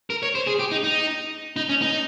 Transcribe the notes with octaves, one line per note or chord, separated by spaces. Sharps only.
A#4
C#5
C5
G#4
G4
D#4
D#4
D#4
C#4
D#4